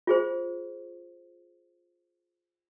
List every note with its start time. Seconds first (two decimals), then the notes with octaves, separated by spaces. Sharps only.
0.07 F4 G#4 C5